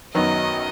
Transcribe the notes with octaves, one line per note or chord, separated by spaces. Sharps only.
F#2 D#3 F#3 B3 D#4 D#5